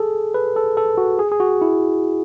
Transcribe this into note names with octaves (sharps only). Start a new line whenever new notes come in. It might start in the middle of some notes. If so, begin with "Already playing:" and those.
Already playing: G#4 A4
B4
A4
A4
F#4
G#4
G#4
F#4
E4